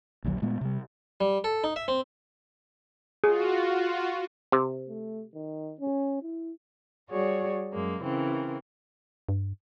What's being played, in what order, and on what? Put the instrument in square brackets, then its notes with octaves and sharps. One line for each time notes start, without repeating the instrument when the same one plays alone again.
[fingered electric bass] A#1 D#2 D3 F#3
A#2 G#3 A3 B3
C3 G3
[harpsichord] G3
A4
D#4
E5
C4
[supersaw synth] F4 F#4 [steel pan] G#4
[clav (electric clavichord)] C3
[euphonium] A3
D#3
C#4
E4
[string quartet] G3 F#4 G#4 C#5 D5
F#2 G#3 A#3
C#3 E3 C4 A#4
[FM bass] G2